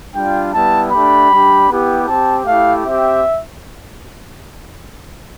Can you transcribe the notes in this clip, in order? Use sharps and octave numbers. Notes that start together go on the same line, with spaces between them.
G3 D4 F4 G5
G3 B3 E4 A5
A3 D4 G4 B5
G3 D4 G4
B3 E4 G4
C4 G4 A5
A3 E4 G4 F5
C4 G4 E5